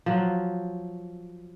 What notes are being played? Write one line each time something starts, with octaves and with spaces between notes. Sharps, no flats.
F3 F#3